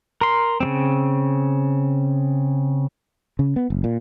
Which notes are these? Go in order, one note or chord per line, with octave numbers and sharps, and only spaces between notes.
A#4 C6
C#3 G3 C4
C#3
B3
F#1
A#2